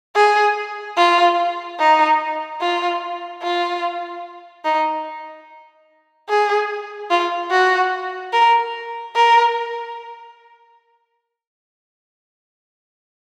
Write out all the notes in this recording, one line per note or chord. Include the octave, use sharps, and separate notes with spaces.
G#4
F4
D#4
F4
F4
D#4
G#4
F4
F#4
A#4
A#4